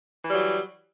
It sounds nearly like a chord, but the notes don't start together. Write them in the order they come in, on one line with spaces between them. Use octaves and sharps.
E3 G3 F#3